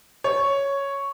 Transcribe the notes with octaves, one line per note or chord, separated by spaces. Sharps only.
C#5